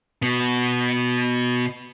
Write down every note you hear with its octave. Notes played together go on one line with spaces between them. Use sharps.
B2 B3